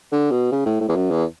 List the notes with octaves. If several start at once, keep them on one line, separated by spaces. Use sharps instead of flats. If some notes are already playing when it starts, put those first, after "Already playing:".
D3
B2
C#3
A2
A2
E2
F#2
E2